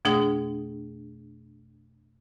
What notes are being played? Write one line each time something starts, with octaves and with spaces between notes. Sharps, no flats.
F2 B2 A3 D4 G#4 D#6